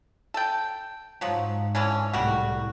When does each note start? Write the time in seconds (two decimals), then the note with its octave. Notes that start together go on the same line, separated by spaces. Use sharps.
0.34 A4 G5
1.21 G#2 F3 F#3
1.75 D3 E3 C#4
2.13 C2 A2 D#3 G3 F#4